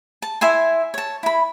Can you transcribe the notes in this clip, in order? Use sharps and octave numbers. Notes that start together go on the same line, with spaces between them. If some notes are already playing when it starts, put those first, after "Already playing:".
A5
E4 E5 G#5 C6
C#5 A5
E4 B5